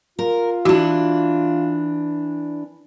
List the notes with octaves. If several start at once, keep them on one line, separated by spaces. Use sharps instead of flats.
F4 A#4
E3 D4 E4 F#4